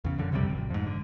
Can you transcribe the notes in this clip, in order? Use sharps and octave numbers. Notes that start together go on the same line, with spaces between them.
E2 C#3
B1 F#2 D3
C2 F2 C3 G3
G#1
F2 G#2
D3